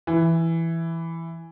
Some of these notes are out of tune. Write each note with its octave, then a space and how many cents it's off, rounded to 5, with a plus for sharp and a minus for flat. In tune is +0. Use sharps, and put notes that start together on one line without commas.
E3 +5